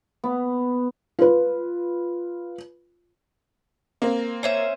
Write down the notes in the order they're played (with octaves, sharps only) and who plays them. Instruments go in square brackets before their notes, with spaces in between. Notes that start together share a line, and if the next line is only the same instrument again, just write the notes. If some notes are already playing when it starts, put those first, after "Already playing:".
[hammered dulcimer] B3
[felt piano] F4 B4
[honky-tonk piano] A#3 C4
[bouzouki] C#4 C5 E5